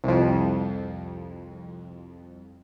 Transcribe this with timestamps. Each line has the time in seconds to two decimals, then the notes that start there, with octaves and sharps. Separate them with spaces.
0.04 C2 F2